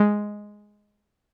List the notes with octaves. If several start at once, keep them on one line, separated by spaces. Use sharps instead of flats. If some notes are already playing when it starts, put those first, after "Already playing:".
Already playing: G#3